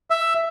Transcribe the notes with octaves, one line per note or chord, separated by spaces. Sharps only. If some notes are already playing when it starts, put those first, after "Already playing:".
E5